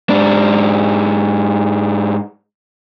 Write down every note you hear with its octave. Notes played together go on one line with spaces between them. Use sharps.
G#2 D4